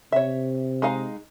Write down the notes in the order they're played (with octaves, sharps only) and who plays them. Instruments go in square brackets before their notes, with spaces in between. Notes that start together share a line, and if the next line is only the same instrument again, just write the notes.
[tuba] C3 [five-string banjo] C#5 E5
[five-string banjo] G#3 D#4 F5